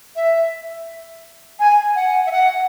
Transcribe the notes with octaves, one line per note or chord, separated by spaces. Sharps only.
E5
G#5
F#5
E5
F#5